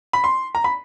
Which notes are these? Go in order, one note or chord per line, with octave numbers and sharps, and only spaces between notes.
B5
C6
A#5
B5